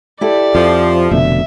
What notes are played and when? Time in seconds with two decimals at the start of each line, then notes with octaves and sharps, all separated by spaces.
0.21 E4 G4 A4 D5
0.55 F2 F3
1.11 F1 B2 D3 E5